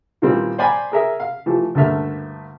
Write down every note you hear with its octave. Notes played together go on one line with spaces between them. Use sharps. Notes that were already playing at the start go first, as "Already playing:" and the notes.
A#2 D#3 E3 G3 C4
C5 D5 G5 G#5 A#5 B5
G#4 A#4 E5
F5
E3 F3 A3 G4
D2 G2 A3 A#3 E5 F6